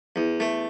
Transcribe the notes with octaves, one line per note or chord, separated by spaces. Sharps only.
E2
A3